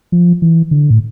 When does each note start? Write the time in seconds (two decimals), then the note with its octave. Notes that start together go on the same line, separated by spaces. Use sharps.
0.12 F3
0.42 E3
0.71 D3
0.90 A2